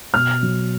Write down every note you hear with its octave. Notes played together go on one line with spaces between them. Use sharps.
B2 F6
F#3